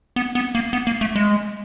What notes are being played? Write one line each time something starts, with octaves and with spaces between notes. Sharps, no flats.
B3
B3
A#3
B3
A#3
A3
G#3